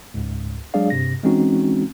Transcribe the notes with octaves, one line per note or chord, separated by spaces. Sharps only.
C#2 G#2
F#3 G#3 D4 G#4 D5 F5
G2 C3 A#6
E3 G#3 C4 C#4 D#4 F#4